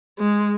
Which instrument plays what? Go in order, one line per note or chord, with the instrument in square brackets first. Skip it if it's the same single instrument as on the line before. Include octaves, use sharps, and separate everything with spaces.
[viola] G#3